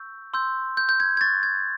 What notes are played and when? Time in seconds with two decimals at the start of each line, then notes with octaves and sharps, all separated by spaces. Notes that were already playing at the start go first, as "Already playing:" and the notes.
Already playing: C#6 E6 G6
0.34 C6 E6 G6
0.77 G6
0.89 G6
1.00 G#6
1.17 G#6
1.21 C#6 F#6 A6
1.43 G#6